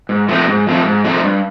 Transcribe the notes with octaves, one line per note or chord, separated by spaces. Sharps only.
G#2
F3 A3 C4 D#4
G#2
F3 A3 C4 D#4
G#2
F3 A3 C4 D#4
G2